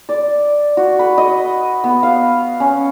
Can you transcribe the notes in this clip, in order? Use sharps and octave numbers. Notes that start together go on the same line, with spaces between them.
D5
F#4
B4
D#5
B3
F5
C#4